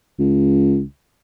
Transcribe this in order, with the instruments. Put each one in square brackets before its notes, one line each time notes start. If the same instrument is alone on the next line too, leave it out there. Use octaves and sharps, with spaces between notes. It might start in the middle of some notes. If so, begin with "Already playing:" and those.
[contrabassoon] C#2